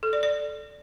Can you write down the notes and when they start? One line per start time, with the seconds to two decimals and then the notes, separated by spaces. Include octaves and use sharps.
0.03 A4
0.13 D5
0.23 D5